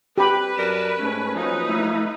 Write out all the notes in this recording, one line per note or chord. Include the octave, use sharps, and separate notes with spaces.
G4 B4 B5
F#2 A#4 D5 A5
G#2 A3 C#4
F3 F#3 A#3 D#4 B4
A3 E4